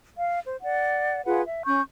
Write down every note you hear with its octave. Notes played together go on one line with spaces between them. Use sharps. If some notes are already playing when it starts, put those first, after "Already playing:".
F5
C5
D5 F#5
F4 G#4 B4 F#5
E5
C#4 C#6 G6